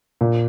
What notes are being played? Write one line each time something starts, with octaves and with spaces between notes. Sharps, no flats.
A#2